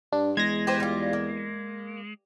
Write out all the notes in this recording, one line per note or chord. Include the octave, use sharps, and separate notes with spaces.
G2 D4
E2 G#3 G#6 A#6
G4 B4 C5
G3 F4
A#3